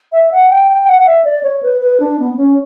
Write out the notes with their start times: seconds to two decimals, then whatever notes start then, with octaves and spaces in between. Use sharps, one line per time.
0.12 E5
0.32 F#5
0.50 G5
0.68 G5
0.88 F#5
0.99 F#5
1.06 E5
1.24 D5
1.43 C#5
1.63 B4
1.81 B4
2.00 D4
2.19 B3
2.34 B3
2.37 C#4